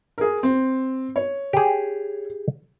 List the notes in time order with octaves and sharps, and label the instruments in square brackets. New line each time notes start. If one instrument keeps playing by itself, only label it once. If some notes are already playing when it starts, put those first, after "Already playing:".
[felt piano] G#4 A#4
C4
C#5
[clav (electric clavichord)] G4 G#4